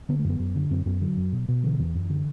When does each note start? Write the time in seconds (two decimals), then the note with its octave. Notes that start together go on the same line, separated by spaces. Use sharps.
0.09 D3 B3
0.19 A3
0.24 F#2 B3
0.39 F#2
0.56 D3
0.71 F#2 C4
0.86 F#2 B3
1.01 D3 F#3
1.17 F#2
1.32 B2
1.48 B2
1.64 D3 E3
1.79 E2 E3
1.94 F#2
2.10 D3